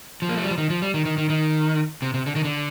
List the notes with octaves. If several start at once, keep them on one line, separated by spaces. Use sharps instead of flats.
F3
A#3
A3
G3
F3
D#3
F3
G3
D#3
D#3
D#3
D#3
C3
C3
D3
D#3
D3